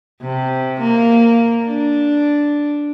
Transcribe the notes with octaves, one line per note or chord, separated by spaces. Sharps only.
C3
A#3
D4